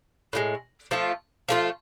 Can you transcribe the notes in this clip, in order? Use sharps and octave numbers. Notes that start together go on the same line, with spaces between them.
A2 F3 G#3
F3 A3 F4
F3 A3 F4